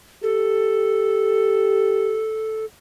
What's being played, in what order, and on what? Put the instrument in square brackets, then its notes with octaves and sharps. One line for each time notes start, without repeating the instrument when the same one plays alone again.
[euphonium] G4 [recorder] A4